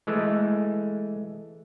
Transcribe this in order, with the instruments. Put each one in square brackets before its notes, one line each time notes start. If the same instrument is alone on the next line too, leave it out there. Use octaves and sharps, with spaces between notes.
[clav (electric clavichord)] E3 G#3 A3